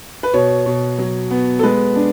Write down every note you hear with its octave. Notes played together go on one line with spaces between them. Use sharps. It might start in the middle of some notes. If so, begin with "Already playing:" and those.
B4
B2 C#5
B2
F#3
B3
A4
G#3 B4
D4